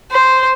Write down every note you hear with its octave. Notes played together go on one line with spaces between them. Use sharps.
C5